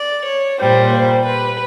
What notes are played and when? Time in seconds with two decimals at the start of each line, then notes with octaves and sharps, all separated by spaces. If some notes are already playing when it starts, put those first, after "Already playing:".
Already playing: D5
0.25 C#5
0.59 A#2 G3 C5
0.93 C5
1.26 B4